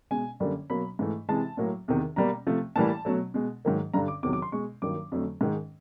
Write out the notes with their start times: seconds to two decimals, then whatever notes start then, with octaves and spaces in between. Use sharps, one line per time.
0.11 B2 G#3 G#5
0.40 F#2 D3 G3 A#3
0.70 B2 F#3 A#3 B5
0.99 G#2 E3 A3
1.29 C3 E3 G#3 A5
1.57 A2 F#3 A#3
1.88 E2 C3 D#3
2.16 B2 G3 A#3 A#5
2.47 C3 F3 A3
2.76 A2 E3 G3 A#3 A5
3.05 B2 F#3 A3
3.34 B2 G#3
3.65 G#2 D#3 F#3 A#3
3.94 G2 D3 G3 A#5
4.08 D6
4.23 E2 C3 D#3 F#3 D6
4.33 D6
4.42 C6
4.52 B2 G#3 C#6
4.82 G2 D#3 F#3 A#3 D6
5.12 F2 D3 F#3 A3
5.41 G#2 D#3 G#3